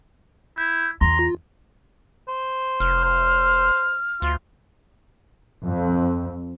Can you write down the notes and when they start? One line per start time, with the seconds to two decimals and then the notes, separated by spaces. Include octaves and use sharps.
0.58 E4 G6
1.01 E2 A#5 C6
1.19 F4
2.28 C5
2.80 F1 F6
3.04 C5
4.22 D2 F4
5.63 F2